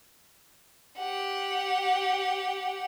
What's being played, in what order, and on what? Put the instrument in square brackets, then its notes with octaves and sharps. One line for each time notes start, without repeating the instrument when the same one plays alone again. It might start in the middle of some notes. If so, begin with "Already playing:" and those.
[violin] G4 F#5